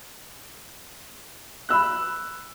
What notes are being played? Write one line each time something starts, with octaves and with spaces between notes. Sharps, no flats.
B5 E6 F#6